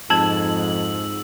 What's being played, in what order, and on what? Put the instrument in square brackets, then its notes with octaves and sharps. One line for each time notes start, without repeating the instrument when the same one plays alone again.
[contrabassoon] F2 [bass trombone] G#2 [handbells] A5 G#6 [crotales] E6 F#7